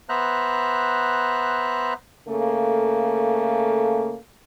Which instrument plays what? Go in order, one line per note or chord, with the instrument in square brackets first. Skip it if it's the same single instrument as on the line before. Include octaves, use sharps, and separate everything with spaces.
[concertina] B3 C5 E5 A#5 F#6
[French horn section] C#3 A3 A#3 A4